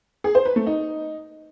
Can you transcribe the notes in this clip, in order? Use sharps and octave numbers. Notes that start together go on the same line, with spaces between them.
G#4
C5
B4
A3
D#4